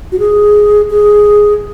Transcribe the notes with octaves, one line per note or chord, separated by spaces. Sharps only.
F#4
G#4
G#4